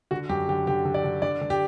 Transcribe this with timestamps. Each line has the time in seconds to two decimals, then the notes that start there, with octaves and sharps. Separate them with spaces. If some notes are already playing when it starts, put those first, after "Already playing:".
0.11 D3 F#4
0.29 F#2 G4
0.49 D3 G4
0.67 D3 G4
0.85 D3
0.94 D5
1.04 D3
1.22 D3 D5
1.41 D3
1.50 G4